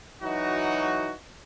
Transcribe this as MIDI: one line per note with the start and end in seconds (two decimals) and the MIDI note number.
0.22 1.12 52
0.22 1.12 54
0.22 1.12 63
0.22 1.12 66